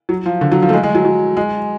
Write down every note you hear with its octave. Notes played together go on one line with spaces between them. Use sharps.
F#3
F3
D3
F#3
F3
A3
G#3
G#3
F#3
F#3
G#3